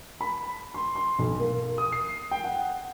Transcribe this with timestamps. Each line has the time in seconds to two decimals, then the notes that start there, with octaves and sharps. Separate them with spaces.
0.21 B5
0.74 C6
0.96 C6
1.19 B1
1.39 A#3
1.78 D#6
1.92 C7
2.31 G5
2.44 F#5